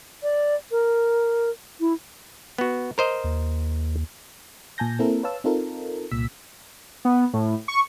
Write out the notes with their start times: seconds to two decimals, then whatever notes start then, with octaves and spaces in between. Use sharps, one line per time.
0.23 D5
0.71 A#4
1.80 E4
2.58 B3 F#4
2.98 A#4 C5 D#5
3.24 D#2
4.78 A#2 G#5 A5 G6 A#6
4.99 A#3 C4 E4 A4 A#4
5.23 B4 C#5 F5 A5 E6
5.44 C4 D#4 F4 A4 A#4
6.11 C2 A#2 E6 B6
7.05 B3
7.33 A2
7.68 C#6